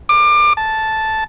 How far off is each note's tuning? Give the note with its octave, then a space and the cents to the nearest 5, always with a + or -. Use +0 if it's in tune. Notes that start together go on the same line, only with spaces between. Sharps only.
D6 +25
A5 -5